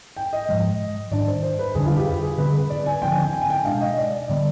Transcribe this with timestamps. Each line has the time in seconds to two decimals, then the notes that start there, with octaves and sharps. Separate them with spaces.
0.16 G5
0.33 D#5
0.49 G#2 F3 G#3
1.11 G#2 D#3 G3 D4 D5
1.28 C5
1.43 C5
1.59 B4
1.75 F2 D3 G3 D4 G#4
1.86 F4
1.96 G4
2.07 B4
2.23 G#4
2.38 D3 G3 C4 B4
2.54 B4
2.70 D5
2.86 G#5
3.02 D3 F3 C4 G5
3.12 G#5
3.23 G#5
3.33 G5
3.42 G#5
3.50 G5
3.65 B2 G#3 D4 F5
3.81 D#5
3.98 D5
4.28 D3 G3 B3 D5